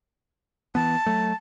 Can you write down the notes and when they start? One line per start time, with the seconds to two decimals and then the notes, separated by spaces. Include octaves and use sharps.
0.75 E3 B3 A5
1.06 F#3 A3